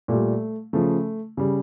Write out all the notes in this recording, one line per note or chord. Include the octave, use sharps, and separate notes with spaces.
A#2 G3 A3
C#3 F3 A3
C#3 G3